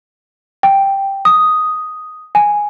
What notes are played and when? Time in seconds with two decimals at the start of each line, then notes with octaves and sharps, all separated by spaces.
0.63 G5
1.25 D#6
2.35 G#5